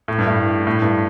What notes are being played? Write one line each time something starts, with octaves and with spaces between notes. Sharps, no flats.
A2
G2
A2
A2
G2